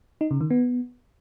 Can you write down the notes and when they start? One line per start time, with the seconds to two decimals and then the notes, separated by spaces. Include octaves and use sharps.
0.21 D#4
0.31 C#3
0.41 D#3
0.50 B3